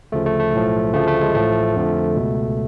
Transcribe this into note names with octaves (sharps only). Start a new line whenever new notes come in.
D2 C#3 F3 A3
A3
A3
B1 A2 F3
D2 C#3 F3 A3
A3
G#3
A1 A2 F3 A3
F2 D3 F3
C#2 B2